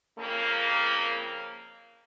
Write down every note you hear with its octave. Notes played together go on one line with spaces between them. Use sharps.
F2 C#3 A#3